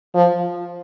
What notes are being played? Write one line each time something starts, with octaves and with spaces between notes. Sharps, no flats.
F3